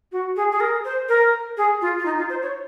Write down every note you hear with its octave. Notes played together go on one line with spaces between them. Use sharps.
F#4
G#4
G#4
A#4
C5
A#4
G#4
F4
F4
D#4
F4
C5
C#5